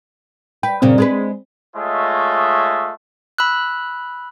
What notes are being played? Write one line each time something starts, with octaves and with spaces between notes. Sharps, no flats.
B4 G5
G2 A#2 C#3 C4
G#3 G#4 B4
G#3 A3 F4 C#5 D#5 E5
B5 E6 F#6